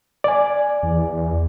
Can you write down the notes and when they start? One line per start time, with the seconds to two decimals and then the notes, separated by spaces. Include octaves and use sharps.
0.24 D5 G#5
0.83 E2